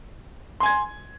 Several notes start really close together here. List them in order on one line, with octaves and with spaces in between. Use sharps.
C6 G#5 G#6